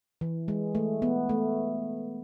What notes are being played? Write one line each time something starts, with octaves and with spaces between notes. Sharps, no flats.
E3
G#3
A3
B3
A3